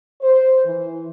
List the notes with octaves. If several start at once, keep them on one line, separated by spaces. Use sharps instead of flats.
C5
E3